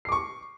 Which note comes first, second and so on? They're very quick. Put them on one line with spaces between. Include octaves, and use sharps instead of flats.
C7 D6 C#6